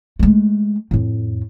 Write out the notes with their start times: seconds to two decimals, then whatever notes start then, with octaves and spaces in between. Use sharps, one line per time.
0.19 G#3 A3
0.91 F2 A2